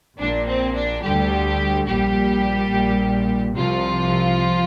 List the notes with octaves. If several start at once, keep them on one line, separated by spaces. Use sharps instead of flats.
A#1 A#2 D4
C4
D4
D2 D3 G3 G4
A#1 A#2 G3 G4
A#1 A#2
C2 C3 F3 F4